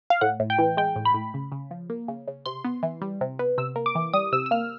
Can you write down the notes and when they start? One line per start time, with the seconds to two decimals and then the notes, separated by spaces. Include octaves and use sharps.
0.10 F5
0.21 A2 F#5
0.40 A2
0.50 G5
0.59 E3
0.77 G#3 G5
0.96 A2
1.05 B5
1.14 A2
1.34 C#3
1.52 C#3
1.71 F3
1.90 A#3
2.08 C#3
2.28 C#3
2.46 C3 C6
2.64 B3
2.83 E3
3.02 G3
3.21 C3
3.39 B3
3.58 C3 E6
3.76 A#3
3.86 D6
3.95 E3
4.13 G3 D#6
4.32 C3 E6
4.46 E6
4.51 A#3 F6